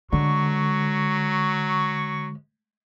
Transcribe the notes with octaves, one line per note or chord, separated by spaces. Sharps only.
D3 F#3 G#3 C#6